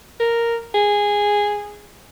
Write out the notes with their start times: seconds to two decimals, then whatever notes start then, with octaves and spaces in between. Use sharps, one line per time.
0.20 A#4
0.74 G#4